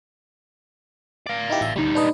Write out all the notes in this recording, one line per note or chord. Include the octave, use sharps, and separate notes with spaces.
D5 F5
D#4 E4 G4
A1 E5
D2 G3 D#4
D4 B4 D#5